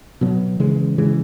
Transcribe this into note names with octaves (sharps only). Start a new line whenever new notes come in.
B2 F#3 B3
C#3 E3 G#3
C#3 E3 G#3